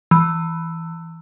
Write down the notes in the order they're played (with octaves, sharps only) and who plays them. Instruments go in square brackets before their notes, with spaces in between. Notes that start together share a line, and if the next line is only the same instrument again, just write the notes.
[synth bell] E3